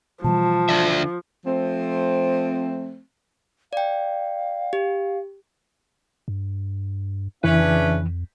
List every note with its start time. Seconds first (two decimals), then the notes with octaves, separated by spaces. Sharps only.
0.24 B2 E3 F3 G3 A5
0.69 D3 D5 E5
1.46 F3 A3 C4
3.73 D5 F5 G5
4.73 G4
6.28 G2
7.44 F2 C#3 E3 C#4 D4 B4 E5